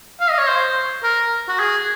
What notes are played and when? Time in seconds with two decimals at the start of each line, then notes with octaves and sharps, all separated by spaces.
0.21 F5
0.30 D#5
0.38 C#5
0.48 C5
1.03 A#4
1.49 F#4
1.60 G#4